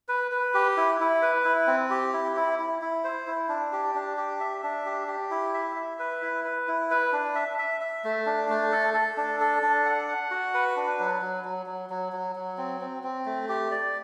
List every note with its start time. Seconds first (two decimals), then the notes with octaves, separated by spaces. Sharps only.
0.09 B4
0.31 B4
0.54 G4
0.77 E4
1.00 E4
1.22 B4
1.44 E4
1.67 C4
1.90 G4
2.13 E4
2.36 E4
2.59 E4
2.81 E4
3.04 C5
3.27 E4
3.49 D4
3.72 G4
3.95 D4
4.17 G4
4.40 E5
4.63 D4
4.85 G4
5.08 G4
5.31 E4
5.54 E5
5.76 E5
5.99 B4
6.22 E4
6.44 B4
6.68 E4
6.91 B4
7.13 D4
7.35 E5
7.58 E5
7.81 E5
8.04 A3
8.26 D4
8.49 A3
8.72 A4
8.94 A4
9.17 D4
9.40 A4
9.62 D4
9.86 F#5
10.08 F#5
10.31 F#4
10.54 B4
10.76 D4
10.99 F#3
11.21 F#3
11.45 F#3
11.66 F#3
11.90 F#3
12.12 F#3
12.35 F#3
12.58 C4
12.80 C4
13.03 C4
13.26 A3
13.49 G4
13.71 D5